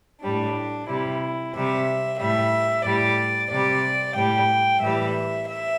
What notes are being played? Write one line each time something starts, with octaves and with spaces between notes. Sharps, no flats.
A2 G3 D4
C3 G3 E4
C3 G3 E5
A2 G3 E5
A2 G3 D5
C3 G3 D5
A2 G3 G5
A2 E3 G3 E5
E5